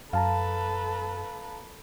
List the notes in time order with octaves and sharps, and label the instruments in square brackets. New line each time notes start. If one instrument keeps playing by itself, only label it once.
[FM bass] F#2 [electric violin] A4 B4 [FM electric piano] F5 A5 A#5